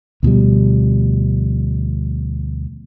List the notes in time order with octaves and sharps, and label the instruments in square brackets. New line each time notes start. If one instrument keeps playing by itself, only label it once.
[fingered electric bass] D2 B2 F3 G3